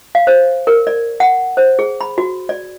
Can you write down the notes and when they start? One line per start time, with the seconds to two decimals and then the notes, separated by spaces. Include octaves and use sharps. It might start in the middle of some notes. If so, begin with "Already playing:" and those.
0.15 F5
0.27 C5
0.67 A#4
0.87 D5
1.20 F#5
1.57 C5
1.79 G#4
2.01 B5
2.18 F#4
2.49 D5